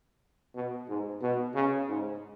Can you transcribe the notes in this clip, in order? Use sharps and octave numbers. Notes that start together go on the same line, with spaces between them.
B2
G#2
B2
C#3
G#2